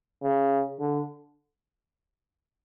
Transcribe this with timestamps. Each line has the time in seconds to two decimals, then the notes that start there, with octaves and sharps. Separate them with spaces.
0.22 C#3
0.79 D3